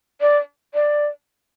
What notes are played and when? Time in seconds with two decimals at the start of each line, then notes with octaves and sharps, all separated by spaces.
0.21 D5
0.74 D5